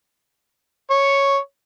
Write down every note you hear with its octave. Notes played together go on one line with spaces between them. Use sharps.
C#5